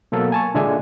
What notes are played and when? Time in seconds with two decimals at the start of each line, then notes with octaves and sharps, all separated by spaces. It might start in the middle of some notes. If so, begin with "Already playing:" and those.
0.12 B2 F#3 A#3 A4
0.32 G#5 A5 C#6
0.54 A#2 D3 G#3 D4 E5 G#5